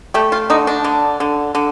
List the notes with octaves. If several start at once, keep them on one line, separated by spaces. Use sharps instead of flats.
A3 G4
F4
D3 D#4
D4
D3
D3
D3